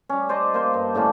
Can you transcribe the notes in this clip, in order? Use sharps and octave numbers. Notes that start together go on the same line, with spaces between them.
G3 C#4
C5 D5 D#5 A5
A#3 C5
G2
A2 D3 A#3 C#4